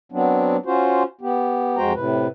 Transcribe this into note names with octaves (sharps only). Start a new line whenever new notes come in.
F#3 B3 C4 D4
C#4 F4 F#4 C5
B3 G4
F2 G#3 F#4 C5 G5 A#5
A2 C3 B4